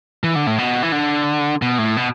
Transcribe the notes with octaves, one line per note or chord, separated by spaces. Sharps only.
E3
D3
A2
B2
E3
D3
B2
A2
B2